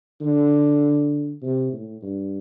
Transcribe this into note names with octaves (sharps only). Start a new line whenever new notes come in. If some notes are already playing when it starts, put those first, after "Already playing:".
D3
C3
A2
G2